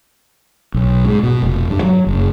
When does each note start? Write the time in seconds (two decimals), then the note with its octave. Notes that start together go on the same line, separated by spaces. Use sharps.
0.74 B1
1.05 G#2
1.23 B2
1.43 F1
1.70 G2
1.82 F#3
2.07 F#1